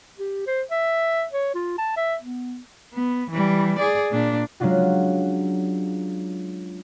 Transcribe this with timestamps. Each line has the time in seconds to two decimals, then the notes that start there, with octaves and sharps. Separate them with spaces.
0.19 G4
0.47 C5
0.71 E5
1.32 C#5
1.55 F4
1.78 A5
1.97 E5
2.22 B3
2.94 B3
3.30 E3 G3
3.79 G#4 D5
4.12 A#2 D4
4.60 F#3 G#3 C#4 D4 F4 F#4